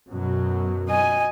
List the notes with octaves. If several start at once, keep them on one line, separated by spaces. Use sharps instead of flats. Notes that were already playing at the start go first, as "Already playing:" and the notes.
F#2 B2 F#3
D#5 G#5